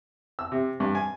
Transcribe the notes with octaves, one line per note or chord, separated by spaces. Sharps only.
E6
C3
G2
G#5